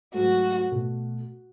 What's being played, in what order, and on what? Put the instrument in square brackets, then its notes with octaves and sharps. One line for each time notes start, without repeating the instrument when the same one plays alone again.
[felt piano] G#2 F#3 A3 [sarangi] F#4
[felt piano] B2 A3